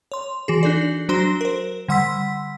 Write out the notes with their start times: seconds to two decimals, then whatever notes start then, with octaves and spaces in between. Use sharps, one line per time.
0.12 C#5 C6
0.48 E3 F#4 G#4
0.63 D4 D#4 A4 D5
1.09 F#3 D4 F#4 C5 C6 G7
1.41 A#4 C5
1.88 D3 G3 F#5 C6 E6 B6